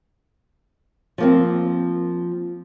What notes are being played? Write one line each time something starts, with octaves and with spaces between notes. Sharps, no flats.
F3 A#3 C4